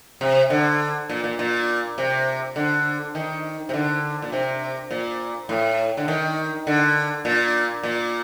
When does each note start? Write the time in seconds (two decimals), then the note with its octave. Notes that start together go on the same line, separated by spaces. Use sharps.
0.21 C3
0.50 D3
1.09 A#2
1.24 A#2
1.39 A#2
1.98 C3
2.56 D3
3.15 D#3
3.69 C3
3.74 D3
4.22 A#2
4.32 C3
4.91 A#2
5.49 A2
5.97 D3
6.08 D#3
6.67 D3
7.25 A#2
7.83 A#2